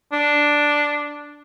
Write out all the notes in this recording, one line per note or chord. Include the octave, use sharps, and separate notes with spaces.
D4